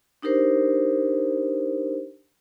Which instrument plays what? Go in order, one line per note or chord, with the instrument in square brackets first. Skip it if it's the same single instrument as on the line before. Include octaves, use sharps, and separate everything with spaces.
[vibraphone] D4 D#4 G4 A#4 C5